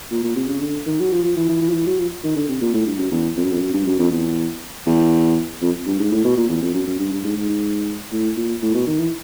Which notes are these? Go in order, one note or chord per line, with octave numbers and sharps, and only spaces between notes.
A#2
A#2
C3
C#3
D3
D#3
F#3
F3
F3
E3
E3
E3
F3
E3
F#3
F3
D#3
D3
C3
A#2
A2
G2
F#2
E2
F2
F#2
F2
F#2
G2
F#2
F2
E2
E2
F2
G2
G#2
A2
B2
A#2
E2
F2
F#2
F#2
G2
G2
G#2
G#2
G#2
A2
A#2
A2
B2
D#3
E3